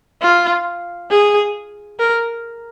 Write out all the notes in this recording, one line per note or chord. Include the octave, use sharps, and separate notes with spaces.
F4
G#4
A#4